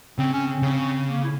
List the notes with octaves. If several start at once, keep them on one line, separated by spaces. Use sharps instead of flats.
C#3 C4
C#4
C4
C#3
A#3
E4